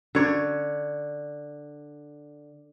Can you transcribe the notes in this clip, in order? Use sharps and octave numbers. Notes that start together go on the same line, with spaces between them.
D3 C#5